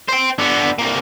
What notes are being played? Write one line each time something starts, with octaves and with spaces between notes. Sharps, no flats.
C5 G5
D3 B3
C2 A#3